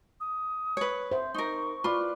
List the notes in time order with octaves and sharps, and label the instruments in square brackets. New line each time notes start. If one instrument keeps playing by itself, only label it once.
[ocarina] D#6
[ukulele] B4 C#5
[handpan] C5 [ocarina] E5
[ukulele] D#4 A#4 [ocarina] C#6
[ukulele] F4 [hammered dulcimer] B4 D5